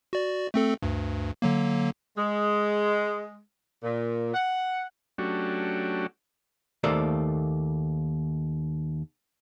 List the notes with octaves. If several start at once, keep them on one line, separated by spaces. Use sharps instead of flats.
F#4 D5
A3 C4 A4
D2 G2
D3 F#3 A#3
G#3
A#2
F#5
F#3 A3 C#4 D4 F#4 G4
D#2 A3 A#3 A4 C5 D5